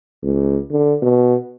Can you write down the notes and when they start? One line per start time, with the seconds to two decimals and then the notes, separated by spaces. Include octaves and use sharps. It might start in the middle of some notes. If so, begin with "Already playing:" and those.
0.23 C#2
0.71 D3
1.02 B2